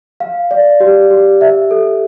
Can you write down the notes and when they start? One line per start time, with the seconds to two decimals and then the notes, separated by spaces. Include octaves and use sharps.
0.20 F5
0.51 D5
0.80 G4
1.11 G4
1.41 E5
1.71 A4